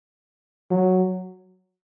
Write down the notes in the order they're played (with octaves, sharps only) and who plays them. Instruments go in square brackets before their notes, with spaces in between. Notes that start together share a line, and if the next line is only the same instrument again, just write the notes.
[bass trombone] F#3